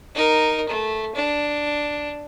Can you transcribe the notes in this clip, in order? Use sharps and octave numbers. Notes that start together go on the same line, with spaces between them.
D#4 A#4
A3
D4